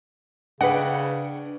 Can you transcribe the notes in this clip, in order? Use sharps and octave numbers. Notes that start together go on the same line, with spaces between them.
C#3 D4 B4 D#5 F#5 G5